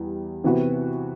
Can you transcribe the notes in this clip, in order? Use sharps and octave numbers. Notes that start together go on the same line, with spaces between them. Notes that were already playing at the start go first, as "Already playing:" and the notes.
Already playing: E2 G3
C3 E3 B3 F#4